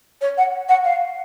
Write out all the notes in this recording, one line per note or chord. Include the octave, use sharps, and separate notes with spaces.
C#5
F#5
F#5
F5